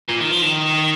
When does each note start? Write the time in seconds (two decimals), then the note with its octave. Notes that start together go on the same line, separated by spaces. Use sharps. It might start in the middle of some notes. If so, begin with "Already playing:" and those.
0.09 A#2
0.21 D#3
0.31 F3
0.42 D#3